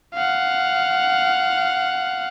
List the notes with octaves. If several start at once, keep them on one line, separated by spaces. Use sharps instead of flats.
F5 F#5